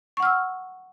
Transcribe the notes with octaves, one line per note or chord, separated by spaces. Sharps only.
F#5 C#6 E6 F6